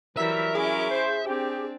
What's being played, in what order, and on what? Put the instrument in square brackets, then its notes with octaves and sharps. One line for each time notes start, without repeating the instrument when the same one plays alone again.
[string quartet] E3 G3 [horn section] F#3 A#4 [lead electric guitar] E5 [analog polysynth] E6 B6
[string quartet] C#4 E4 D6 [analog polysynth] G#4
[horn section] C5
[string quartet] C4 D4 [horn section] G4